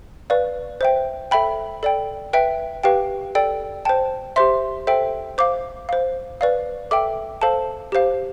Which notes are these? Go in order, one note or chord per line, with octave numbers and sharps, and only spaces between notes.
B4 D5 F5
C5 E5 G5
A4 E5 G5 B5
A4 D5 G5
B4 E5 G5
G4 B4 F5 G5
A4 D5 G5
C5 G5 A5
G4 C5 E5 C6
A4 C5 E5 G5
C5 F5 D6
C5 F5
B4 D5 F5
A4 E5 G5 D6
A4 C5 F5 A5
G4 C5 F5